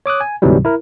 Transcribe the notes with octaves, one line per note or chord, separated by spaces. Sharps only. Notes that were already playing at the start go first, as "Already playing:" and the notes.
C#5 D6 D#6 F#6
G#5
D2 G#2 C3 E3 F#3 G3
E4 A#4